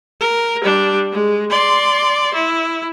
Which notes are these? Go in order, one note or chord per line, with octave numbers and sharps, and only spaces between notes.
A#4
G3 D4
G#3
D5 C6
E4